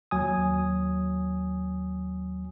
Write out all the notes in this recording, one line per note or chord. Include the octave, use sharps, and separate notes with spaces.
D#2 F#3 G#5 D#6